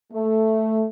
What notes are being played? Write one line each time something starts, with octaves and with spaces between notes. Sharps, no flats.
A3